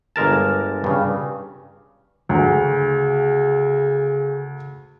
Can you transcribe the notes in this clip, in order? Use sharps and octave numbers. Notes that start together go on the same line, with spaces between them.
G1 G#3 A#4 A5
G2 C#3
D2 C#3